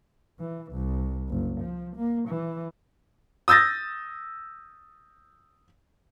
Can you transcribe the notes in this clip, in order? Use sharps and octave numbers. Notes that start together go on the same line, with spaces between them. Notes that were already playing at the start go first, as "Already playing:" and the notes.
E3
C2
F#1
F3
A#3
E3
D#6 E6 G6 A6 A#6